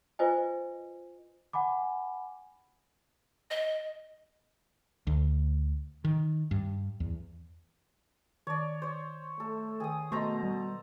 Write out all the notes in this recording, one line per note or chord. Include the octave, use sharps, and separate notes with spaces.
F4 B4 C5 D#5 G#5
F#5 G#5 B5 D6
D#5
D2
D#3
G2
E2
D#3 C#5 D5 A5
C5 C#5
A3 A4
D#3 G#4 G5 G#5 D#6
B2 A3 A4 C5 D#5 A#5 C6 C#6
G3